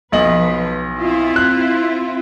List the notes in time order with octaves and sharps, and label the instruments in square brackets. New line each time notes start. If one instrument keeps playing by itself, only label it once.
[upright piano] B1 D#5 F#7 [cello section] F3 B4
[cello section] C4 E4 F4
[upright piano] F#6